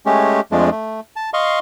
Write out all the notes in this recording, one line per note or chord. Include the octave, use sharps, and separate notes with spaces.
G#3 A3 C#4 G4
F2 F3 G#3 A3 D4
A3
A5
D#5 F5 C6 C#6